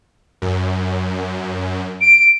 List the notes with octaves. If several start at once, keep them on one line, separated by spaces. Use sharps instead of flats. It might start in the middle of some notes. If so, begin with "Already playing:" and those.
F#2
D7